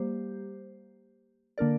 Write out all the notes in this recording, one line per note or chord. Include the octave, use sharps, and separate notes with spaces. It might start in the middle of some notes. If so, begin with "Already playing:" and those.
Already playing: G3 A#3 G4 C5
D3 A#3 D4 A#4 D5